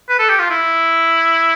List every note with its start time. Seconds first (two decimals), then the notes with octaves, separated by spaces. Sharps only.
0.09 B4
0.19 A4
0.29 G4
0.39 F4
0.50 E4